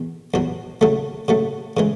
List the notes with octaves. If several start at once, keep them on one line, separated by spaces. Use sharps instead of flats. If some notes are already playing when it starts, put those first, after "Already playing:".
Already playing: E2 B2
E2 B2 F#3
C#3 F#3 A3
C#3 F#3 A3
C#3 E3 G#3